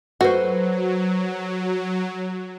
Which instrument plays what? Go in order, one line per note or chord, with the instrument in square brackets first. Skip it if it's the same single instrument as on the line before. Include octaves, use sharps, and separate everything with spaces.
[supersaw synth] F#3 [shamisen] F#4 [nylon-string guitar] A4 B4 C5